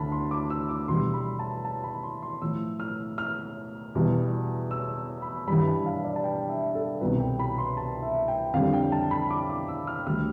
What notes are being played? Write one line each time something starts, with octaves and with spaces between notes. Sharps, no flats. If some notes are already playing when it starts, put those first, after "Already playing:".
Already playing: D2 D3 A5 B5
C6
D6
E6
D6
E2 B2 G3 C6
B5
A5
A5
B5
C6
C6
A2 F3 E6
F6
F6
E2 B2 G3
E6
B5
G2 E3 G3 B5
A5
F5
D5
A5
G5
E5
A4
C2 B2 G3 B4
G5
B5
C6
A5
E5
G5
F2 D3 G3 F5
G5
A5
B5
D6
D6
E6
F6
D2 D3 G3 F6